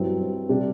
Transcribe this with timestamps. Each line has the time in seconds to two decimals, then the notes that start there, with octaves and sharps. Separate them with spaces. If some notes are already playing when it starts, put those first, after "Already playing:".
Already playing: G2 F#3 C4 E4
0.49 C3 G3 D4